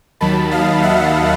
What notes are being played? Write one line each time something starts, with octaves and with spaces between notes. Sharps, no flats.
D#2 D#3 F#3 A5 B5
D#5 F5
E5 F#5